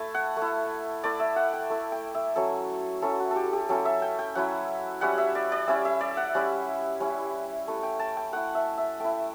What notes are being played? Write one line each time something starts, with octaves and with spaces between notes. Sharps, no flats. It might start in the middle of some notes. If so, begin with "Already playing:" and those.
Already playing: A3 E4 A5
F#5
A3
E4
A3 E4 D5
E5
F#5
G5
A3 E4
G5
E5
F#3 C#4 E4 A4
F#3 C#4 E4 A4
F#4
G4 A4
G4
F#3 C#4 E4 A4
E5
G5
G5
F#3 C#4 E4 F#5
G3 C#4 E4 F#5
E5
D5
D5
G3 C#4 E4 E5
E5
D5
F#5
G3 C#4 E4
G3 C#4 E4
A3 E4
G5
A5
G5
A3 E4 F#5
E5
E5
A3 E4 G5